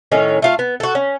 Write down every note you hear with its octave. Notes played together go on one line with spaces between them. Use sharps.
A2 D#3 C#4
A3 F4 F5
B3
F#4 A4
C#4